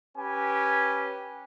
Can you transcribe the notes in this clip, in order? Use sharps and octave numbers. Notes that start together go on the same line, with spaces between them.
C#4 G4 B4 G#5